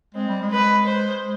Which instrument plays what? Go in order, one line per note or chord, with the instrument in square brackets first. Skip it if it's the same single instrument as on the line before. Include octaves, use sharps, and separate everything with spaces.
[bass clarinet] G#3 [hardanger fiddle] C4
[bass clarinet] G3
G#3
[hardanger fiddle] B4
C5
[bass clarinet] G#3